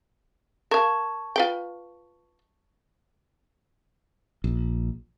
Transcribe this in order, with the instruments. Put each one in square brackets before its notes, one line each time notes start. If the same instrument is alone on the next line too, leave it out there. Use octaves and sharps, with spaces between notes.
[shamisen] A#4 F5 [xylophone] A5 C#6 G#6
[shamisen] F4 B4 G5
[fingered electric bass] A#1